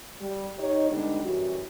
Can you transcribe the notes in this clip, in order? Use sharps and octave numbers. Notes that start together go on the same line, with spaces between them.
G3
D#4 G4 C#5
D3 G3 G#3 B3 D4 D#4
F#2 E3 G3 F#4